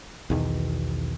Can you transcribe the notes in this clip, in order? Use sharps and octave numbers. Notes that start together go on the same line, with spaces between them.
B1 E2 D#3